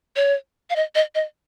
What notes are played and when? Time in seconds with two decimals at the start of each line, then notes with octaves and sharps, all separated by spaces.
0.16 C#5
0.70 F5
0.76 D#5
0.95 D#5
1.15 D#5